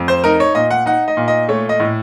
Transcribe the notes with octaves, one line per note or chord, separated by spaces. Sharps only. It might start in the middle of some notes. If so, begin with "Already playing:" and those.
Already playing: F2
C5
D#4 A#4
C#5
A#2 D#5
F#5
D#4 F#5
D#5
A#2
D#5
A3 C#5
D#5
A2